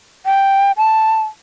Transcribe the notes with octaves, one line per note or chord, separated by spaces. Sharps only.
G5
A5